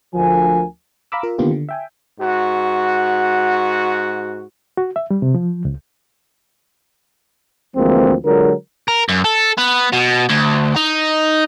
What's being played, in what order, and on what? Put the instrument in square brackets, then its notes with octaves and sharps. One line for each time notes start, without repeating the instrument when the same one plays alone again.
[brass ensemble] D2 F3 A#4 G#5
[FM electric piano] F5 A#5 B5 D6 E6
F4 A#4
D3 D#3 A#3 B3 F4 G4
D3
E5 G5 G#5
[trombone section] G#2 F#4
[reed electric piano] F#4
E5
G3
C3
F3
C#2
[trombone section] D2 E3 F3 G#3 A#3 C4
D3 F#3 G#3 F4 A#4
[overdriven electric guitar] A#4
F#2
A4
B3
B2
D2
D#4